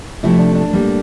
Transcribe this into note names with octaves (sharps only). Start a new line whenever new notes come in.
C3 F3 A3 E4
D4
D4
A2 G3 A#3